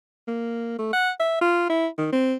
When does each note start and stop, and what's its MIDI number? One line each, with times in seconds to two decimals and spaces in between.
0.28 0.75 58
0.79 0.90 57
0.93 1.10 78
1.20 1.36 76
1.41 1.69 65
1.70 1.87 64
1.98 2.10 51
2.13 2.35 60